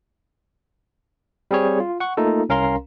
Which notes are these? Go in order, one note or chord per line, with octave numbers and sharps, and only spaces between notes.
G3 C4 G#4 C#5
F4
F#5 C#6
A3 A#3 D#4 F4 A4
C2 C#4 A#4 F5 A#5 C6